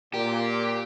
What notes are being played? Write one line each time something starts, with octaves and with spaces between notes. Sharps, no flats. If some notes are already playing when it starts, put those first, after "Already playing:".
A#2 G4